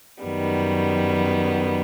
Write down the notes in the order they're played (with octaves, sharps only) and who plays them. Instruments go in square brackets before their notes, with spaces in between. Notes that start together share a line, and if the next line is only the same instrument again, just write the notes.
[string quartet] F#2 D#3 G3 B3